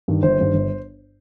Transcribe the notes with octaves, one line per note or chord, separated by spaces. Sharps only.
G2 D#3
G1 C5
G2 D#3
G1